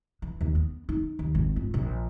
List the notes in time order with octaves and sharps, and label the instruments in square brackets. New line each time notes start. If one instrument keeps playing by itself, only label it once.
[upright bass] E3
D#2
B3
D#4
D#2
G#1
F4
A#1